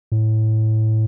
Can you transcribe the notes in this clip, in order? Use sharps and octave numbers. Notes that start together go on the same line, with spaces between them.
A2